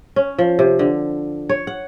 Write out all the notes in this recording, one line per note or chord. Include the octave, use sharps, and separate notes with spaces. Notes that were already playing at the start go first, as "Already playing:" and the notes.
C#4
F3
C3
D3
C#5
F#5